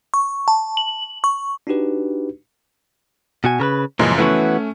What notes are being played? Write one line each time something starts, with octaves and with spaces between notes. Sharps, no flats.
C#6
A5
F#7
C#6
D4 D#4 F#4 G4 B4
B2 F#4 G#5
C#3 A#4 B4
F#2 A#2 C#3 E3 F3 G#3
E3 A3 B3 C#4 F#4